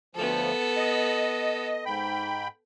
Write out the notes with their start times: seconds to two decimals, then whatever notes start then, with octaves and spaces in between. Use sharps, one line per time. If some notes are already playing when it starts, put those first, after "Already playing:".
0.15 D2 F3 B3 A4
0.77 D#5
1.86 G#2 G5 B5